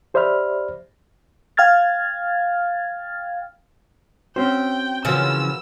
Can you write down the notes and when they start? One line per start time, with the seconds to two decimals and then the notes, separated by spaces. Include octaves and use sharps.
0.14 G4 C5 D5 E5 B5 F6
1.57 F5 G5 F6 G#6 A6
4.36 C4 C#4 F#4 C5 G5
5.05 C#3 E3 F3 F#4 A#4 B4 E6